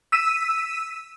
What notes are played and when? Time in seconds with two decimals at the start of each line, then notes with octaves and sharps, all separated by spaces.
0.12 E6 B6 D#7 E7